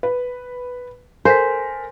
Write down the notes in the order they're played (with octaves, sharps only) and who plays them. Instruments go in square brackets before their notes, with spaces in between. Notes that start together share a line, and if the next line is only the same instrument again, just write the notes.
[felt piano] B4
[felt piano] A4 A#4 [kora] C5 [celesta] G#5 B6